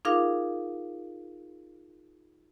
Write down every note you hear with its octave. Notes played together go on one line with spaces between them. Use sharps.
D#4 F4 G#4 A#4 F5 D6